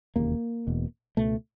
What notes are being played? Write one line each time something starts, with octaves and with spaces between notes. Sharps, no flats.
E1 D#2 C#3 A#3
E1 E2 B2
C#2 B2 A3